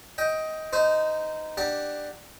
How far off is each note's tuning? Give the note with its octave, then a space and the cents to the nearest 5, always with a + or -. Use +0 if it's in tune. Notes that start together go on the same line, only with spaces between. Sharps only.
D#5 +15 G5 +0
D#4 +0 C5 -30
D4 +15 G4 +0 F#5 +0